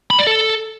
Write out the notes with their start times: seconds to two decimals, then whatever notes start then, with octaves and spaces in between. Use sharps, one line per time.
0.11 B5
0.19 D5
0.27 A4